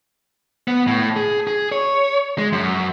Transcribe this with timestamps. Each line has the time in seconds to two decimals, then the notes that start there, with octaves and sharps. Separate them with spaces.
0.68 B3
0.87 A2
1.16 G#4
1.47 G#4
1.72 C#5
2.38 G#3
2.53 F#2